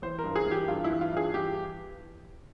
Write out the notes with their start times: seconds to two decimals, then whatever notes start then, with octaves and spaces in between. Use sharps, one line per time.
0.02 E3 C5
0.19 A#4
0.24 G2
0.36 G#4
0.46 E3
0.51 G4
0.68 G2 F4
0.84 E4
0.90 E3
1.01 F4
1.12 G2 G#4
1.34 E3 G4